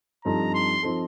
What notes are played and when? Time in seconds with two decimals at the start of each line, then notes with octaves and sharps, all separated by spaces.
0.25 G2 F3 C4 D#4 A4 A#5
0.54 C6
0.83 F3 C4 D#4 A4